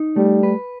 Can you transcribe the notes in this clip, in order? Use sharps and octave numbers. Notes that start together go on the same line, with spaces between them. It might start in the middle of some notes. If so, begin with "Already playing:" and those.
Already playing: D#4
G3 A3
B4